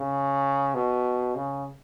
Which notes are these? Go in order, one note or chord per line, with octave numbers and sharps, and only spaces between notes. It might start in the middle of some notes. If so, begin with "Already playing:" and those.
Already playing: C#3
B2
C#3